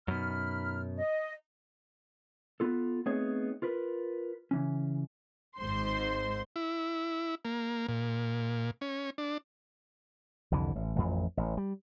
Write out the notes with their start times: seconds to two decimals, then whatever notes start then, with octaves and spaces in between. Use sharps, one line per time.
0.08 F#2 B2 D#4 B5 F6
0.97 D#5
2.60 B3 F4 A4
3.06 A3 B3 C4 D#4 G#4 C#5
3.62 F4 A#4 B4
4.51 C#3 E3 C#4
5.60 G#1 G#2 C5 C6
6.56 E4
7.45 A#3
7.89 A#2
8.81 C#4
9.18 D4
10.51 C2 F2 D3 E3
10.75 A1
10.96 A1 F2
11.37 A1
11.57 G3